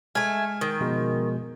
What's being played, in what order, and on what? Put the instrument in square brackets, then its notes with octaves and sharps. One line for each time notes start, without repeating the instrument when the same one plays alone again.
[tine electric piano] G#3 F6 [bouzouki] A3 G#5
[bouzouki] D#3
[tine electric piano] B2 F3 G#3